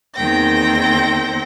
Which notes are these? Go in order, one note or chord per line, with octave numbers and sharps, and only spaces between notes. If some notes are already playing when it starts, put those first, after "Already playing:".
E2 D#3 A#3 C4 G5 A#6